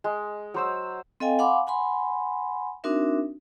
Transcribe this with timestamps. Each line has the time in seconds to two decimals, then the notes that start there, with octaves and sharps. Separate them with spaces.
0.04 G#3
0.54 F#3 C5 E6
1.20 C4 A4 D#5 F5 G5 G#5
1.39 F5 F#5 G#5 B5 C6 D6
1.67 F#5 G#5 B5 C6
2.84 C4 D4 D#4 F#4 A#4 E5